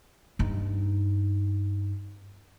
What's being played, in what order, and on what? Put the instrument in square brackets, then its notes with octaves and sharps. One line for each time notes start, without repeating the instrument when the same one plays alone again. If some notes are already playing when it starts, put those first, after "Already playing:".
[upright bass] G2 D#4